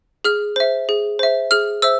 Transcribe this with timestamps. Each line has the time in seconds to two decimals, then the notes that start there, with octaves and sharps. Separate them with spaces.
0.24 G#4 F6
0.56 C5 E5
0.89 G#4
1.19 C5 E5
1.51 G#4 F6
1.82 C5 E5 E6